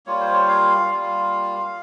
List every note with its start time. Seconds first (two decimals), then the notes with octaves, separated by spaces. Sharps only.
0.06 G3 A#3 F4 C#5
0.21 C5
0.33 C#5
0.48 F5
0.89 G3 A#3 F4